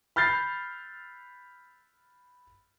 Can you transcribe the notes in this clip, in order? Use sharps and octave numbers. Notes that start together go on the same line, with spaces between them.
B5 F6 G6 A6 C7